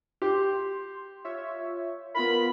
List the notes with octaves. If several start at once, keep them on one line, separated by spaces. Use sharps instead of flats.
G4 C6
F4 C#5 E5
B3 F4 A#4 B5